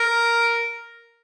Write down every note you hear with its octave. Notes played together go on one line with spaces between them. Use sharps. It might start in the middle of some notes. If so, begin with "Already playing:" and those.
Already playing: A#4